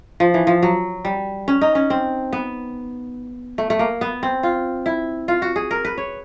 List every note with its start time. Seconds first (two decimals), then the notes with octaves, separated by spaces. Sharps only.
0.20 F3
0.34 E3
0.47 F3
0.63 F#3
1.05 G3
1.48 C#4
1.61 D#4
1.75 C#4
1.90 C4
2.33 B3
3.58 A3
3.70 A3
3.79 A#3
4.01 B3
4.23 C4
4.43 F4
4.86 E4
5.28 F4
5.42 F#4
5.56 G#4
5.71 A#4
5.85 B4
5.98 C#5